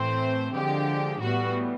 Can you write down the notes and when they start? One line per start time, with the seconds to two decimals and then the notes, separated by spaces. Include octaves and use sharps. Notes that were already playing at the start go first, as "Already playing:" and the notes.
Already playing: A2 E3 A3 C4 C5
0.55 D3 F3 G#3 G4
1.22 A2 E3 G3 B3 F#4